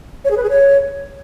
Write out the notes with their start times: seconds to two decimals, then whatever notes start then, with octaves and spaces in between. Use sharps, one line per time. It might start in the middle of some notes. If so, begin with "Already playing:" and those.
0.25 C#5
0.31 G#4
0.37 B4
0.43 G#4
0.50 C#5